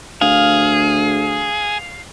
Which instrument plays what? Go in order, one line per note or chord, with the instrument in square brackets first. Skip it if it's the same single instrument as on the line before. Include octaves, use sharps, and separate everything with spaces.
[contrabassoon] D2 [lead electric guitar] G#4 [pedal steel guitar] F5